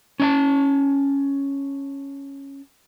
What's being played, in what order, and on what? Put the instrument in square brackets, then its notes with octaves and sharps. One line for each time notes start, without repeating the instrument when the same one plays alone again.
[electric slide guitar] C#4 D4 A5